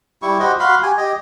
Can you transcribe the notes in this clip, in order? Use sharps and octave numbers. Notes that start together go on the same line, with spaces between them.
G3 E4 G4 C#6
F#4 G4 C5 D#5
F#4 F5 B5 C6
G4 G#5
G4 D#5